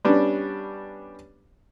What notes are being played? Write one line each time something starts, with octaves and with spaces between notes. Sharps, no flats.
G3 B3 C#4 D4